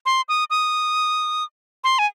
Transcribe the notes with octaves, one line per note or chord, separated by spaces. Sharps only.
C6
D#6
D#6
C6
G#5